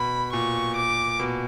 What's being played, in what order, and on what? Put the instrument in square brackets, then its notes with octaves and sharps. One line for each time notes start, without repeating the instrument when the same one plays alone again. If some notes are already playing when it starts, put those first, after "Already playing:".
Already playing: [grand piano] B2 [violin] B5
[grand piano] A#2 [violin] C#6
[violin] D6
[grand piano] B2